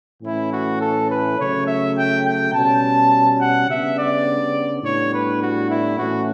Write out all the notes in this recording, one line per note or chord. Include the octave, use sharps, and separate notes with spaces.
A2 E3 A3 C#4 E4
F#4
A4
B4
C#3 F#3 A3 C#5
E5
G5
G5
B2 G3 C#4 A5
F#5
C#3 G3 B3 D4 E5
D5
A2 G3 B3 D4 C#5
B4
F#4
E4
A2 E3 A3 C#4 F#4